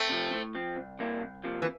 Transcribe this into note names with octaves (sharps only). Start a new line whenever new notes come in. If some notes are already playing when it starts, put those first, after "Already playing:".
Already playing: A3 C4
C3 F3
A2
F3 C4
C2
C3 G3 A#3 E4
C2
C3 F3 A#3
E3